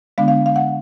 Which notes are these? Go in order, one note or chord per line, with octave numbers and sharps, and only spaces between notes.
D3 G#3 B3 D4 F5
F5
F5
F#5